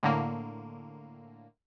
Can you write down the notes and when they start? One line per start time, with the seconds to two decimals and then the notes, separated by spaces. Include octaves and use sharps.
0.03 A2 D3 A#3